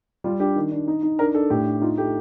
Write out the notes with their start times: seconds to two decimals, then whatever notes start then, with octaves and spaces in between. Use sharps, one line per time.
0.24 G3 F4
0.40 D4 G4
0.56 D#3
0.71 D4
0.88 D#4
1.03 D#4
1.19 D4 A#4
1.34 D4 A4
1.50 A2 G4
1.66 D4
1.82 D#4 F4
1.98 A3 G4